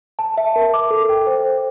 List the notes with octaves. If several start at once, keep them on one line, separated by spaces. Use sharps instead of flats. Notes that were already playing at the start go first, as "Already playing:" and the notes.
A5
E5
A#4
D6
A4
G5
C5
C5